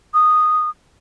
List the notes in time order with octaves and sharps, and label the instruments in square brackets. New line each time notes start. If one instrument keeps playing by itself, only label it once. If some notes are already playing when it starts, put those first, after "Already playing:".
[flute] D#6